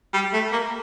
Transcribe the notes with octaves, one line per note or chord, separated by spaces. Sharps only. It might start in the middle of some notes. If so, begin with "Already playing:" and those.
G3
A3
A#3